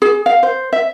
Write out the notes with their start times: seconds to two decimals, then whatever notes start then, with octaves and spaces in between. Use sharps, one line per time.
0.02 G#4
0.26 F5
0.43 C5
0.73 E5